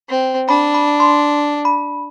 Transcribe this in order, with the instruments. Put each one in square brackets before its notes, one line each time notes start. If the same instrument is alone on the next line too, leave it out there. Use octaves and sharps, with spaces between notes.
[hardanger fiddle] C4
[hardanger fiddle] D4 [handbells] B5
[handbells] B5
C6
B5